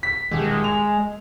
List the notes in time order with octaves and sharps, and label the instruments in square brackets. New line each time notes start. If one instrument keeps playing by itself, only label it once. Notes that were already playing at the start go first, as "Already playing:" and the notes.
[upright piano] B6
[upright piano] D#1 [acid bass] G#3
[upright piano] F7